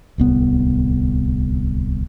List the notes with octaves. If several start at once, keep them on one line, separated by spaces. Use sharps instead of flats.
D1 C2 B3